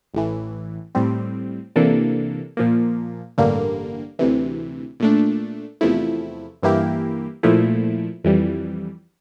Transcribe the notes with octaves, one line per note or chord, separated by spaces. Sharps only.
A1 A2 E3
A2 G3 C4
C3 E3 A#3 D4 A4
A#2 F3 A#3
A1 G2 D3 G3 A#3
D2 C3 E3
A#2 A3 D4
E2 C3 F3 A3 E4
G2 E3 A#3 E4 G4
A#2 F3 A3 E4
F2 E3 G3